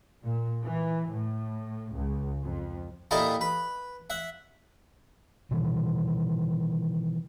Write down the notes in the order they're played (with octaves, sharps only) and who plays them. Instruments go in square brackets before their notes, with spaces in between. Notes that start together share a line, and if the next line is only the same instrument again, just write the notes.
[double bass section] A#2
E3
A2
C#2
F2
[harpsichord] A#2 D#4 E4 G4 A4 D#5
B4
E5 F#5
[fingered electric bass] B2 D#3 E3